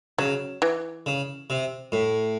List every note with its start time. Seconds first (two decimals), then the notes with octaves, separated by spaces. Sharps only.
0.18 C#3 F#3
0.62 E3
1.06 C#3
1.50 C3
1.92 A2